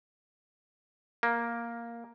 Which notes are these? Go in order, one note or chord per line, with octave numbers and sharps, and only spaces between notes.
A#3